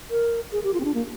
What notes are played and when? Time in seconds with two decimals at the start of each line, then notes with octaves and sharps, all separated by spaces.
0.11 A#4
0.52 G#4
0.64 G4
0.74 F4
0.80 C4
0.84 D4
0.94 A#3